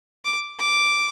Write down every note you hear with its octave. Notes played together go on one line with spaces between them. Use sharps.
D6
D6